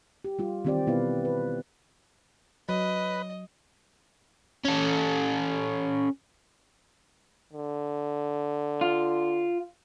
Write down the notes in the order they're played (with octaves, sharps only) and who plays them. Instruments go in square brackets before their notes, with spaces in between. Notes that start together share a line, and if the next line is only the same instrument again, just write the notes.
[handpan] G4
G3 F4
D#3 E3 C4 G4 C5 D5
B2 B3 E4 B4 F5
B4
[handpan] F#3 [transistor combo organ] B4 [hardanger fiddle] D#5
[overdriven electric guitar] C#4 A4
[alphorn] D3
[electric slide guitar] F4